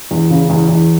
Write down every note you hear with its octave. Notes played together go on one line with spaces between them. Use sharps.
E2
C#3
E2
E2